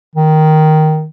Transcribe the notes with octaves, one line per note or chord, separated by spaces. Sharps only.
D#3